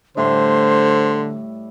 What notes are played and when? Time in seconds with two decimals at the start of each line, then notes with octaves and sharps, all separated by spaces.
0.17 A2 D3 G3 C5 E5 C6